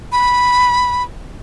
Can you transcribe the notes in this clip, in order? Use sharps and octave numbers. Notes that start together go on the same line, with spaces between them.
B5